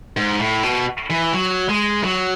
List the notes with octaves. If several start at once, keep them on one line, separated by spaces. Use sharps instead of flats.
G#2
A2
B2
E3
F#3
G#3
F#3